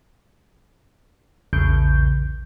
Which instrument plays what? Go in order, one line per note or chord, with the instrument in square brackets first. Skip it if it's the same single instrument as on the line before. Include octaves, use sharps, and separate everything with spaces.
[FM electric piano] A#1 E2 C#3 G6